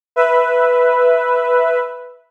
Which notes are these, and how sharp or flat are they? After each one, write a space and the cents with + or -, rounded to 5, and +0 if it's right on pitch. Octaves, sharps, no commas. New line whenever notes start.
B4 +0 E5 +0